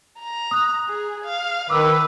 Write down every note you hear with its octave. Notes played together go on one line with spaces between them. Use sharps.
A#5
D#6 F#6
G#4
F5
D#3 B4 D6 E6